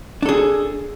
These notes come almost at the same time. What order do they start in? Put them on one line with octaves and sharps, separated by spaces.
D4 A4 G#4